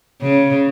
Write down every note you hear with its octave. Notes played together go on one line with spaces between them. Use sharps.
C#3